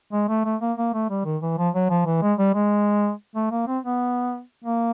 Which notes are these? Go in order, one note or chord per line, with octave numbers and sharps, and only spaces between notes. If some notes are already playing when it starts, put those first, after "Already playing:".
G#3
A3
A3
A#3
A#3
A3
G3
D#3
E3
F3
F#3
F3
E3
G#3
G3
G#3
A3
A#3
C4
B3
A#3